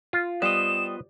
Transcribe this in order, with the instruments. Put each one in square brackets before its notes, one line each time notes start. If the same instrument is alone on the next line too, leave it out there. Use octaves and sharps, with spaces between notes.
[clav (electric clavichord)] F4
[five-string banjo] G3 [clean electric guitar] B3 C5 D#5 [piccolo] E7